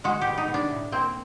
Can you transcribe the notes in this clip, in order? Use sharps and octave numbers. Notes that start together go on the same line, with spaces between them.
G#3 F#4
G4
B2
D#4
B2
D4
A2
A#3 C4